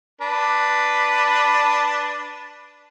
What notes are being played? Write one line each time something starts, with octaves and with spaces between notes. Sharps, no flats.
D4 B4